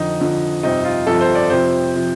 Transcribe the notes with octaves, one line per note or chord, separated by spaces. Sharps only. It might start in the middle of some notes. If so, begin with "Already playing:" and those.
Already playing: F2 D3 F3 D#4
F2 D3 F3
G1 F2 C3 F3 D#4
F4
G1 F2 C3 F3 A4
C5
D5
F2 C3 F3 C5
C3 F3